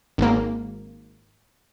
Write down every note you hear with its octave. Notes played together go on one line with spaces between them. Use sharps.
G#1 A#3